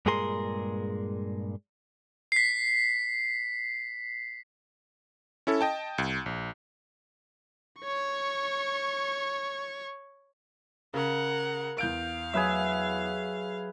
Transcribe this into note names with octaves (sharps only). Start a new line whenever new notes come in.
G2 A#2 G#3 G#4 A#4 C6
B6 C7
C#4 E4 A4
D#5 G5 A5
C2
A#1
C#5 C#6
C#3 A#4 F#5
E2 F5 G6 D7
F#3 G#4 B4 E5